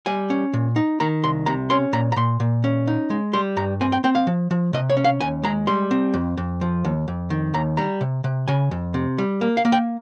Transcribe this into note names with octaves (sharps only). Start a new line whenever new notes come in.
G3 G#5
C#4
A#2
D#4
D#3 A#5
C2 C6
C3 A#5
C#4 C6
A#2 A#5
A#5
A#2 C6
A#2
C#4
D#4
G#3
G3 C6
G2 A#5
C4 G#5
G5
C4 G5
F5
F3
F3
C3 D#5
C#5
C#4
F5
D#2 G#5
G#3 A#5
G3 C6
C4
F2
F2
F3
D#2
F2
D#3
D#2 A#5
G3 A#5
C3
C3
C#3 G#5
F2
C3
G3
A#3
F5
A#3
G5